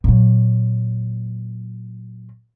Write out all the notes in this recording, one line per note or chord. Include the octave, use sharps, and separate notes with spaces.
A#2 F#3